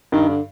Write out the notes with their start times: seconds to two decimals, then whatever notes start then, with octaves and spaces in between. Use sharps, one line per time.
0.12 G2 D#3
0.29 D3